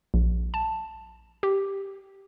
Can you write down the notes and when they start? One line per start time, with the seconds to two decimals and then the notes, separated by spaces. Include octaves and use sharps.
0.14 A#1
0.54 A5
1.43 G4